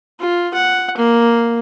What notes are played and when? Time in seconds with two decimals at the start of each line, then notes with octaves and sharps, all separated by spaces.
0.19 F4
0.54 F#5
0.98 A#3